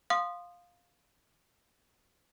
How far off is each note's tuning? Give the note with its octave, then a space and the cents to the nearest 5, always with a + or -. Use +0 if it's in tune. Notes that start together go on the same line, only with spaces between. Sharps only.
F5 +10 C6 +0 D#6 -20